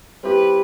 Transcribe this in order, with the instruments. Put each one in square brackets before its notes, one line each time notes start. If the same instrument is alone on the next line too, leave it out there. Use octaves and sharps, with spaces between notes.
[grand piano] G3 C4 E4 G4 [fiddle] B4